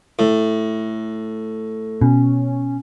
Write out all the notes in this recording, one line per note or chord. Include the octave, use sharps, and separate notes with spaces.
A2
B2 C#4